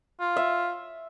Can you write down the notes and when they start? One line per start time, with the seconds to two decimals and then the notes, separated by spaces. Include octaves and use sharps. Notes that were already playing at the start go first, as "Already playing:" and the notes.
0.20 F4
0.37 E5